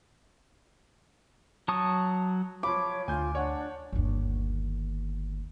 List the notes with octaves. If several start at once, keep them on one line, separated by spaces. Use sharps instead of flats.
F#3 A5 C#6 D#6
F3 C#5 B5 D6
D2 F4 G#5 G6
D4 C#5 F#5
G1 D#2